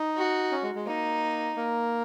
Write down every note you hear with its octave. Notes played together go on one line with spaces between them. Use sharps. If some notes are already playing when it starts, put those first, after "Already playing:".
Already playing: D#4
F#4
C#4
G#3
G#3
A#3 D#4
A#3